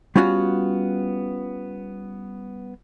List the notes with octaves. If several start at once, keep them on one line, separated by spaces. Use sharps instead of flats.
G3 B3 C#4 F4 F#4